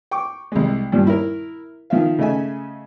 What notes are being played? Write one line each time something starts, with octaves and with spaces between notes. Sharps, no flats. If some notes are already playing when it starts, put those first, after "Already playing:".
G5 C#6 D6
C2 G#3
G2 A#2 F3 G3
E4 A#4
D#3 F3 F4 E5 F5
C#3 A3 D#5 E5 G#5